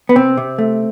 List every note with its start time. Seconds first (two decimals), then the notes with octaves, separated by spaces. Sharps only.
0.09 B3
0.16 C3 C4
0.37 C3
0.58 A3